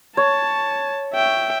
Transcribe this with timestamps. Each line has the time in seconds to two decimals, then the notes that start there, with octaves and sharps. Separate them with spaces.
0.17 C#5 A5
1.13 E5 G5